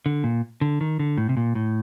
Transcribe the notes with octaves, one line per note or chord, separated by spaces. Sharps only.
D3
A#2
D3
D#3
D3
A2
C3
A#2
A2